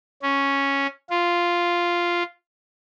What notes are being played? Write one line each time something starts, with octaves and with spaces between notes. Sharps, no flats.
C#4
F4